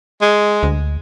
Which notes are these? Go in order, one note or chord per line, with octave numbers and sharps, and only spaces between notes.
G#3
D2